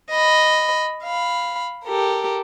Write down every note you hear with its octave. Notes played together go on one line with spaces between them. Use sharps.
D#5 B5
F5 B5
G4 A4 A#4